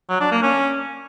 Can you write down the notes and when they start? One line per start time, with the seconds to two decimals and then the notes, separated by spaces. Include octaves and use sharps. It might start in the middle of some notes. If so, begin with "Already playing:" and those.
0.09 F#3
0.20 D4
0.31 A#3
0.43 C#4